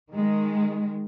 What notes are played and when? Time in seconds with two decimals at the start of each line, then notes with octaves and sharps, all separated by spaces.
0.11 D#3 G#3